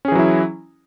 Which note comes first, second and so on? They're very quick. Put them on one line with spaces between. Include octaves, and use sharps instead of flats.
C#4 G#4 E3 F#3 E4